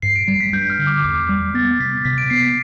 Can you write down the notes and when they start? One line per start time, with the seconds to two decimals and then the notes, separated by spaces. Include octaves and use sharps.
0.02 G2 C7
0.16 D7
0.28 G3 C7
0.40 B6
0.53 G2 G6
0.70 F6
0.79 D3
0.87 D6
1.04 E2 D6
1.29 G3
1.54 B3 A6
1.79 C3 B6
2.05 C3 B6
2.18 D7
2.30 B3 C7
2.43 B6